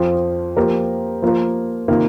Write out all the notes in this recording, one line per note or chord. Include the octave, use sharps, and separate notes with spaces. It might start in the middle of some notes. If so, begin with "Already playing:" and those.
Already playing: F2 F3 C4 F4
F3 A#3 G4 A#4
F3 A#3 F4 A#4
C3 D#3 A#3 F4